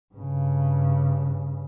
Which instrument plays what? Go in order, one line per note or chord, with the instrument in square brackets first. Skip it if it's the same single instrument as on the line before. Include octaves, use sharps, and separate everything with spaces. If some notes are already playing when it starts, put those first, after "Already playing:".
[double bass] G2 C#3